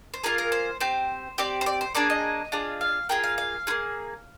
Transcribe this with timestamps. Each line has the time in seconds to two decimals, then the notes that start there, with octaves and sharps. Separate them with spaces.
0.14 C5
0.24 A#3 F4 G#4 A#4
0.38 A#4
0.52 C5
0.80 C4 G4 C5
1.38 C4 G4 D5
1.61 C5
1.66 D5
1.81 C5
1.95 A#3 D4 G#4 D5
2.10 D#5
2.52 D4 F4 G#4
2.81 F5
3.09 A#3 F4 G#4 G5
3.24 F5
3.38 F5
3.67 A#3 F4 G#4